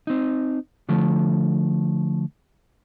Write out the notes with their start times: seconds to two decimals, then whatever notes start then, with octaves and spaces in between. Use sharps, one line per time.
0.07 C4 D#4
0.89 D3 F3 A3